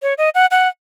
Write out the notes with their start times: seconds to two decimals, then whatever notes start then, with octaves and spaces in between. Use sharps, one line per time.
0.03 C#5
0.18 D#5
0.35 F#5
0.51 F#5